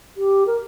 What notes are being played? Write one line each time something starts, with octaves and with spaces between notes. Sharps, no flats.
G4
A#4